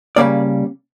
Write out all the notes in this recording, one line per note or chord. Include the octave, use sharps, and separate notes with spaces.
C#3 E3 G3 A#3 C#4 D5